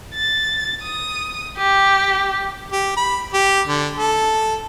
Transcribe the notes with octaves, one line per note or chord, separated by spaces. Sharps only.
A6
D#6
G4
G4
B5
G4
D3
A4